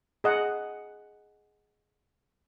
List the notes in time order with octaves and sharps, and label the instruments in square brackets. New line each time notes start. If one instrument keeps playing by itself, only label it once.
[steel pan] G#4 D#5 F#5